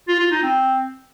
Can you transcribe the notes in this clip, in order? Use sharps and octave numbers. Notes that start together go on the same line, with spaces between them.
F4
F4
D#4
C4